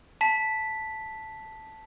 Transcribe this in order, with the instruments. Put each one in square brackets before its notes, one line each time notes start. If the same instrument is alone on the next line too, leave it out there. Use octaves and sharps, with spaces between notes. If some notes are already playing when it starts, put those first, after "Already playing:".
[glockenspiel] A5 B6